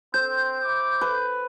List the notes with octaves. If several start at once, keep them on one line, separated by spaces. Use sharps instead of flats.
C4 C5 G6
E4 D6
B4